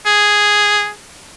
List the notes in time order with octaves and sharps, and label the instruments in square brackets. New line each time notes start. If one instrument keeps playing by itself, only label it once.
[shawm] G#4